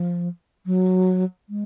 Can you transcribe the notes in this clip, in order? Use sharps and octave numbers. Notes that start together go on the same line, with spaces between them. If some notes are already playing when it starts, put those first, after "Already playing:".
Already playing: F3
F#3
G#3